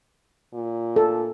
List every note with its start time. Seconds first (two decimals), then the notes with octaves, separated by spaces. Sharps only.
0.54 A#2
0.96 A4